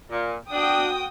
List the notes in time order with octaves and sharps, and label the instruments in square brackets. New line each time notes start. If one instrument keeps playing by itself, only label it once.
[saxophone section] A#2
[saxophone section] D4 [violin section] F#4 G5 D#6